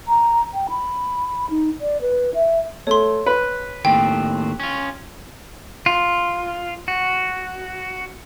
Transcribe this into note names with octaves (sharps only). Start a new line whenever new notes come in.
A#5
G5
B5
D#4
D5
B4
E5
A3 C#5 C6
B4
D#2 A2 C4 G5
C#4 F4
F4
F#4